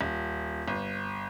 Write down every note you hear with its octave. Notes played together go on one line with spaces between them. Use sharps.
D#1
G1